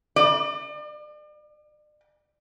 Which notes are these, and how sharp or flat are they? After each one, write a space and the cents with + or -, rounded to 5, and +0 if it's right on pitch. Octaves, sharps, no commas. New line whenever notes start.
D5 +40